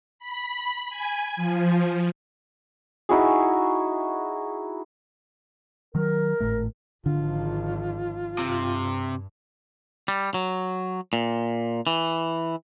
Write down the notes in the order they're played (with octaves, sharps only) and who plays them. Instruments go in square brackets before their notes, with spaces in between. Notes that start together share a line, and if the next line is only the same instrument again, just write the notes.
[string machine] B5
G#5
F3
[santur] D#4 E4 F#4 G#4
[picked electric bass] D#3 F#3 [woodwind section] A#4
[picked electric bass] G#1 A2 A3
[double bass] G#1 F3 [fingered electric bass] D3 [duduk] F4
[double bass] G2 [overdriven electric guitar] C3
[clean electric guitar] G3
F#3
A#2
E3